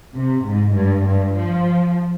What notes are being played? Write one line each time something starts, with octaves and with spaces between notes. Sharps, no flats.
C3
G#2
G2
G2
F3